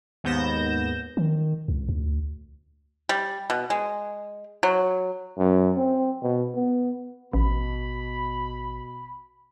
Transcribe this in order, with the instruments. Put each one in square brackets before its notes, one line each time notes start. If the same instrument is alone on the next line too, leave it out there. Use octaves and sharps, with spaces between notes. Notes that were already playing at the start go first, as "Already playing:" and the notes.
[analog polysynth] D#2 G#2 B3 G6 A#6 E7
[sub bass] D#3
C#2
D2
[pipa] G3
B2
G#3
F#3
[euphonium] F#2
C4
B2
B3
[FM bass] A1 [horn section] B2 B5